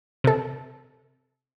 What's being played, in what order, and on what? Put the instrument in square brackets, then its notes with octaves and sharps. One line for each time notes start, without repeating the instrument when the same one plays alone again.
[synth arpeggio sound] C3 A4